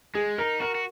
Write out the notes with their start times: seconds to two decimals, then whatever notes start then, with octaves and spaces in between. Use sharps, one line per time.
0.15 G#3 G#4
0.38 D#4 A#4
0.60 F#4 A#4
0.75 F#4